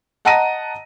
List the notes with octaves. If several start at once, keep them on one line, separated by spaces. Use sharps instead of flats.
D#5 F#5 A5 A#5 A#6 D#7